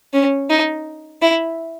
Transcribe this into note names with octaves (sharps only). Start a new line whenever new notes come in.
C#4
D#4
E4